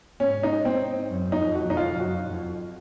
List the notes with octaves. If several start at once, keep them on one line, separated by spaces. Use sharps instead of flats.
G#2 C#4
D#4
C4
F#2
D#4
F2
F#4
F2 D#4
F4
F#2 F#4
F2